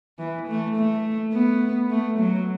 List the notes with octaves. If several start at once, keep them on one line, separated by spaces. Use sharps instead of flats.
E3
A3
A3
B3
A3
F#3